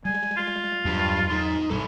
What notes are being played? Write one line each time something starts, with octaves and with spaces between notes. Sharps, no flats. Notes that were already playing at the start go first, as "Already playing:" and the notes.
G3 G#3 G#5
F4
E2 G2 F#3
D#4 C6
B1 G2 G3 C#4 A4